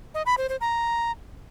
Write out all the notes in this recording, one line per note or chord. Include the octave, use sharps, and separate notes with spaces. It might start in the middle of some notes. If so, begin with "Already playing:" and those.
D#5
B5
C5
C5
A#5